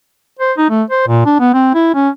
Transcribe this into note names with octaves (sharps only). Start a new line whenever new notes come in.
C5
D#4
A3
C5
A#2
D4
B3
C4
E4
C#4